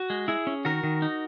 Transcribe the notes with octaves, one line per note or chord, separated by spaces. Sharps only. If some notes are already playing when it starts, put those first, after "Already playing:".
Already playing: F#4
G#3
E4 G#4
C#4
D#3 F#4 A#4
D#3
D#4